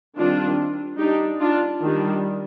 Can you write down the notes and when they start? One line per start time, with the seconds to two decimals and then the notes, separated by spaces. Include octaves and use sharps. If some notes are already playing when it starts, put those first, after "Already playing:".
0.17 D#3 G3 C4 D4 F4
0.98 G3 D4 D#4 G4
1.40 D4 F4
1.81 D#3 G3 D4